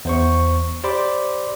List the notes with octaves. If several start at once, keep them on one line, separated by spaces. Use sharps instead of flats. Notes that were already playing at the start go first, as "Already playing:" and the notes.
E2 C5 C#6
G4 C5 D5 B5 C6 D6